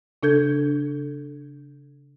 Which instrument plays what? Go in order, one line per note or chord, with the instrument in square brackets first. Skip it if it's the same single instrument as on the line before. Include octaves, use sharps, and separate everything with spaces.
[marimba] C#3 D4 A4 G6 G#6